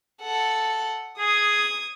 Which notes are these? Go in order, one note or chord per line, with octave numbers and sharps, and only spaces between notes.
A4 F#5
G#4 D#6 G#6